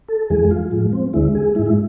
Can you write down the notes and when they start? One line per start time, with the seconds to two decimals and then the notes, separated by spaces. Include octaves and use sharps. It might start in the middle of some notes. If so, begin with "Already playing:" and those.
0.09 A4
0.30 F2 E3 G#3 G#4
0.51 F4
0.71 A2 F3 G#3
0.93 C4
1.14 D2 D3 G#3 E4
1.35 G#4
1.55 G#3 E4
1.59 G#2
1.66 E4